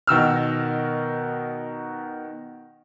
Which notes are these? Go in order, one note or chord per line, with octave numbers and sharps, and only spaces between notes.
B2 D#3 E6 F6